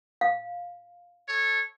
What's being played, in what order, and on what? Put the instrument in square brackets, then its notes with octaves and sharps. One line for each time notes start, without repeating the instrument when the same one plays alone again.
[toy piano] F5
[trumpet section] A4 C#5